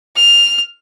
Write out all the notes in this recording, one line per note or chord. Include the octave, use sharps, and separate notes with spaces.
F6